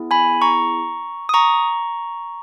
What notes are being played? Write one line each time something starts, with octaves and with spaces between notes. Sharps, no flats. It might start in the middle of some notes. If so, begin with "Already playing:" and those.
Already playing: B3 E4 G#4
G#5 B5
A#5 C#6
D#6
A#5 C#6